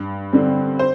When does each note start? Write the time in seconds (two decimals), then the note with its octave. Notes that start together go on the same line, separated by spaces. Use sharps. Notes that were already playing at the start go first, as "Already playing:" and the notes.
Already playing: G2
0.33 D3 G3 C4
0.79 C5